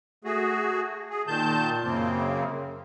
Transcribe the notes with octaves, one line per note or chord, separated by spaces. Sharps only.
A3 F#4 G#4
G#4
A#2 D#3 A5 G6
F#2 C#3 A#3 C4